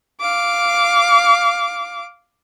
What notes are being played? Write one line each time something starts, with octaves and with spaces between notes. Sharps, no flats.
F5 D6